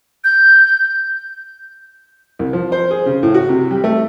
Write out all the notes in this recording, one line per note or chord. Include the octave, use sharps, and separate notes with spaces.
G6
C2
F3
C5
G#4
C#3
A2
F#4
C3
G3
A3